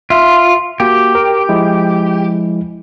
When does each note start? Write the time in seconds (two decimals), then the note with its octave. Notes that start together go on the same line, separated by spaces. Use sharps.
0.10 F4 E5
0.80 A#3 F#4 G4
1.15 A#4
1.49 F3 G#3 E4